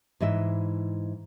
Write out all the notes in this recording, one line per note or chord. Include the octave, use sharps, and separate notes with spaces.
G#2 E3 D#5 E5